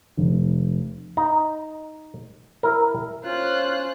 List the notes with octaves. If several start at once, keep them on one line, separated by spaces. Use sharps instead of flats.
F1
D#4 A#5
E4 A#4
C#4 F4 C5 F#6